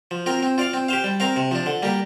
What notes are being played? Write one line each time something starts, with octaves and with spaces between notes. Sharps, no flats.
F3
C4 F4 A#4
C4
F4 D5 F5
C4
G4 C5 F5
G3
C4 A#4 F5
C3
F3 D4
D3
G3 A#3 G4